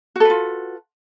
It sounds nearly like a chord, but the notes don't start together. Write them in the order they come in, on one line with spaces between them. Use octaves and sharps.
F#4 A4 B4 F4